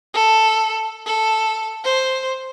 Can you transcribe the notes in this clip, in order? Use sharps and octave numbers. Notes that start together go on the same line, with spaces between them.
A4
A4
C5